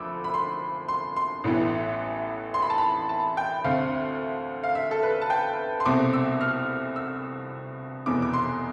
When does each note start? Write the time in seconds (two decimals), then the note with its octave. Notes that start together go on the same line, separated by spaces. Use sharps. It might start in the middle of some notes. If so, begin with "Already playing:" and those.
Already playing: D2 F3 A3 B5 D6 E6
0.24 B5
0.34 C6
0.88 C6
1.16 C6
1.44 A1 A2 E3 B3
2.54 C6
2.62 B5
2.70 A5
2.78 B5
3.09 A5
3.37 G5
3.64 D2 D3 A3 C4 F5
4.63 F5
4.75 E5
4.91 A4
5.03 B4
5.22 A5
5.30 G5
5.80 C6
5.85 C2 B2 A3 C4 D6
6.13 E6
6.41 F6
6.96 E6
8.06 F1 E2 B2 B3 D6
8.22 D6
8.33 C6